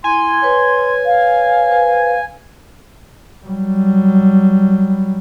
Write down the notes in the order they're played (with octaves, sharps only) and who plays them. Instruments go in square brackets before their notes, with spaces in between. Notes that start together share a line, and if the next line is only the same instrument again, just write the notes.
[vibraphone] E4 [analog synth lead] G#5 [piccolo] C6
[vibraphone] B4 C#5
[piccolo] F5
[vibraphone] B4 C5
[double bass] F#3 G3